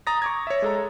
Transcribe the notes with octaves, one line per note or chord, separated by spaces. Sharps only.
A#5 D#6 A6 A#6
C#6 D6 G#6
C#5 E5
G#3 A4 A#5